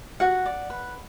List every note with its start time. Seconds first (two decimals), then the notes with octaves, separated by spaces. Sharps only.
0.20 F#4 F#5
0.45 D5
0.70 B4